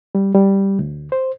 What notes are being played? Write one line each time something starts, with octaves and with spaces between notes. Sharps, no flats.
G3
G3
D2
C5